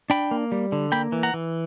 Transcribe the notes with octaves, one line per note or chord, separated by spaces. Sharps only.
D4 G5 B5
A#3
G3
D3
A#3 G5 B5
E3
F#5 A#5
E3